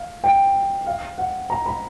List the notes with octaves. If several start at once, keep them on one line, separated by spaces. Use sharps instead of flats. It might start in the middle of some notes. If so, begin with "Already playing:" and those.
Already playing: F5
G5
F5
F#5
A#5
B5